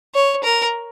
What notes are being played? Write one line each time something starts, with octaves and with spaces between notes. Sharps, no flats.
C#5
A#4